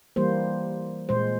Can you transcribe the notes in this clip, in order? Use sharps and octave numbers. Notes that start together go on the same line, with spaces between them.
E3 G3 A#3 C5
A#2 G#3 C5